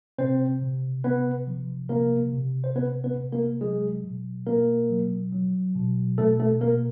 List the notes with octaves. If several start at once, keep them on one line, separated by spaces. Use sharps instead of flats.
C3 C4 C5
C3
C3 B3 B4
F3
C3 A#3 A#4
C3
C5
C3 B3 B4
B3 B4
C3
A#3 A#4
F#3 G#3 G#4
B2
B2 A#3 A#4
F#3
F#3
B2
B2 A3 A4
A3 A4
B2 A#3 A#4